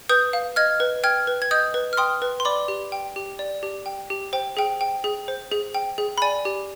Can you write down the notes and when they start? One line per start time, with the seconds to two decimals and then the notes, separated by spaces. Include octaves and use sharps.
0.09 B4 D#6 G6
0.33 F5
0.56 D#5 F6 G#6
0.80 B4
1.04 G5 F6 G#6
1.27 B4
1.42 G#6
1.51 D#5 D#6 G6
1.74 B4
1.93 F6
1.97 G5 C6 D#6
2.22 B4
2.40 C6
2.45 D5 B5 D6
2.68 G4
2.92 G5
3.16 G4
3.39 D5
3.63 G4
3.86 G5
4.10 G4
4.33 C5 G5
4.57 G#4 G5
4.81 G5
5.04 G#4
5.28 C5
5.52 G#4
5.74 G5
5.98 G#4
6.18 B5
6.22 D5 G#5
6.45 G4